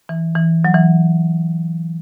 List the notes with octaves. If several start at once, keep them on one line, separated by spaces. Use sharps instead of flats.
E3
E3
F#3
E3